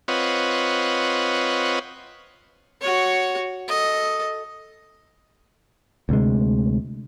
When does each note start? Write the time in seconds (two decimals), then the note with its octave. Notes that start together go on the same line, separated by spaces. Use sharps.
0.08 C4 F4 B4 C#5 D#5 F#5
2.81 F#4 C#5
3.68 A4 D#5
6.09 D2 C3 G#3